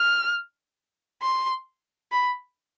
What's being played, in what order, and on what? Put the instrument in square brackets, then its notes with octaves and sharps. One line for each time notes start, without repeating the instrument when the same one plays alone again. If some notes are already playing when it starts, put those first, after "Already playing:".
Already playing: [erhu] F6
C6
B5